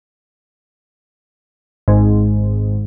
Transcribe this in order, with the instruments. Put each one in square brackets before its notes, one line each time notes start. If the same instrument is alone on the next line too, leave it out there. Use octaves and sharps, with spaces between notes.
[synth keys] G#1 G#2